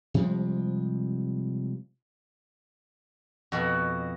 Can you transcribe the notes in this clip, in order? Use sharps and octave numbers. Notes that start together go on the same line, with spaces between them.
C3 F3 G3 G#3
F2 B2 F#4 B5